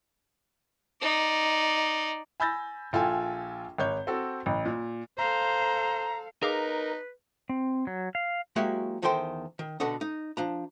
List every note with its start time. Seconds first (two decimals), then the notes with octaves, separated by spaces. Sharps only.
1.01 D#4 D5
2.40 G#5 B5 E6 G6 A6 A#6
2.93 A#1 F4 A4 G5 G#5
3.78 G#1 C#5 G6
4.07 C4 F#4 A4
4.46 A1
4.65 A#2
5.18 A4 C5 F5 A#5
6.43 D#4 G#4 A#4 B4 F5 D6
7.49 C4
7.87 F#3
8.15 F5
8.56 F#3 G#3 A#3 E4 F#4 G4
9.02 E2 D#3 A4 C5 G5 C6
9.59 D#3
9.80 B2 D3 F#4 A4 D#5
10.01 D#4
10.37 F3 D4 A#5